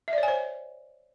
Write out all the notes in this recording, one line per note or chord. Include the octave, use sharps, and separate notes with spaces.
E5
D5
C#5
G#5
C5